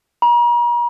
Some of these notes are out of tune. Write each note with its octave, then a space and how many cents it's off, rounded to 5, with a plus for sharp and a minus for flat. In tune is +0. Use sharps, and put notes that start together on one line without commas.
A#5 +40